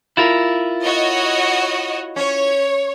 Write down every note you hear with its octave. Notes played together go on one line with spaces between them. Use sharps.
E4 F4 A#4
F#4 C#5 D#5
C#4 C#5